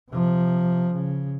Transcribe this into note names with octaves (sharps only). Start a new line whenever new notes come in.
C3 F3
C#3